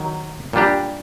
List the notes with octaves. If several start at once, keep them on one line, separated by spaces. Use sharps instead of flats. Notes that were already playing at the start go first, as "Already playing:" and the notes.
Already playing: D#3 F#3
A#2 G3 D4 G4